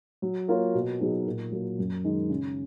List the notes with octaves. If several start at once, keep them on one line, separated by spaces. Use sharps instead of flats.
F#3
A#3 F4 A#4 C#5
B2
F#3 B3 D#4 G#4
A#2
F#3 A#3
F#2
D#3 G#3 D#4
C#3